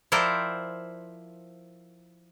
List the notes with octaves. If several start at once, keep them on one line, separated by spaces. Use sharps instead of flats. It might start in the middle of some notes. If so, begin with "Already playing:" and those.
F3 E4 A#4 C5 D5 G5